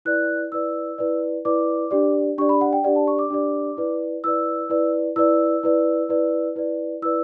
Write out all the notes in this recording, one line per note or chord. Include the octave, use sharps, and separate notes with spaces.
E4 B4 D5 F#6
E4 B4 D5 E6
E4 B4 D5
E4 B4 D5 D6
D4 G4 D5
D4 G4 D5 C#6
B5
F#5
G5
D4 G4 D5 F#5
A5
C#6
D6
D4 G4 D5
E4 B4 D5
E4 B4 D5 E6
E4 B4 D5
E4 B4 D5 E6
E4 B4 D5
E4 B4 D5
E4 B4 D5
E4 B4 D5 E6